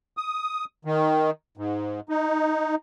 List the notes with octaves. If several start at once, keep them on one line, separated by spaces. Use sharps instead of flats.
D#6
D#3
G#2
D#4